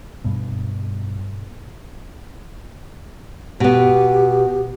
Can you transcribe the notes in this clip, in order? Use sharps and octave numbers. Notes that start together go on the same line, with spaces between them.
G2 B2
B2 B3 G4